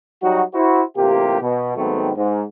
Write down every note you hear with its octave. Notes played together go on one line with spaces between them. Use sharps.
F#3 G3 D#4 F#4
E4 F#4 C5
A1 C3 A#3 F4 G4
B2
G#2 D#3 F#3 A3 B3 C4
G#2